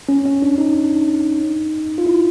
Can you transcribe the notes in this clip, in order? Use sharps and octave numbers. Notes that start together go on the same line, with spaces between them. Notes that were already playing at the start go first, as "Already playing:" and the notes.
C#4
C#4
D4
D#4
F4
E4